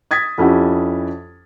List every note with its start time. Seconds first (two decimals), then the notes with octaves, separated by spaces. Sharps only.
0.11 D#6 G#6 A6 B6
0.38 F2 C#4 E4 G4 F#5